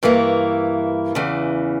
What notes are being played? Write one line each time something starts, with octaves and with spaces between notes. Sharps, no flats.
G2 E3 A#3 E4
E2 C#3 E3